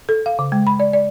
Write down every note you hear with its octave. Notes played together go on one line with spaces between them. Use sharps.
A4
F5
C#3
G#3
B5
D5
D5